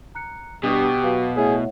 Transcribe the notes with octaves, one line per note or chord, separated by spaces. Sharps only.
A#5 F#6 C#7
G2 B2 G4 C#6 D#6 F#6
F#3 B4 F5 D6
A2 G#4 C#5 E5 F#5